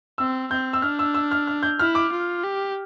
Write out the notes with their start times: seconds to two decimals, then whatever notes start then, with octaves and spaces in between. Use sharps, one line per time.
0.18 C4 E6
0.51 C4 G6
0.73 E6
0.82 D4 F6
0.99 E6
1.14 E6
1.31 F6
1.47 F6
1.63 G6
1.79 E4 F6
1.95 D6
2.12 F4
2.43 G4